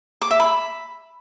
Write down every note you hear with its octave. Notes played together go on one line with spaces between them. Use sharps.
D6
E5
B5